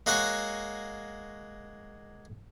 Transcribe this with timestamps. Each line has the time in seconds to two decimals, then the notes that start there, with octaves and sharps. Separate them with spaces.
0.06 G#3 A#3 F#4 C#5 F#5 G#5